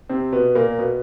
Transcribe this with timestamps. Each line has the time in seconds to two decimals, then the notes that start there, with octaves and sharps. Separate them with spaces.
0.09 C3 C4
0.32 B2 B3
0.55 A#2 A#3
0.78 B2 B3